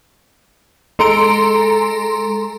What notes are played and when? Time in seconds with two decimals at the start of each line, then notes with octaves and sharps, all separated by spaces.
0.99 G#3 A4 A#5 C6 D7